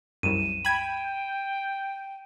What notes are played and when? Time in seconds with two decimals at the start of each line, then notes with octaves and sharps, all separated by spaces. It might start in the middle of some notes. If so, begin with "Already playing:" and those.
0.23 C2 F#2 D#7 E7
0.65 G5 B5 G#6